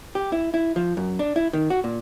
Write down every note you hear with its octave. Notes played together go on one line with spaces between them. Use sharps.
G4
E4
E4
F3
F#2
D4
E4
D#3
F#4
A#2